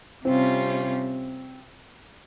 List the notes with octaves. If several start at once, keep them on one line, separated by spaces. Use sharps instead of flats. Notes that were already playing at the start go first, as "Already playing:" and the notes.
C3 G3 C4 C#4 F4